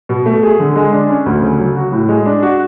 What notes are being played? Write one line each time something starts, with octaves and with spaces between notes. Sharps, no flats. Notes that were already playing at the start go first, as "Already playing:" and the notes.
B2
A3
G#4
D3
G#3
D4
C#4
D2
C#3
F#3
F#4
A2
G#3
D4
F#4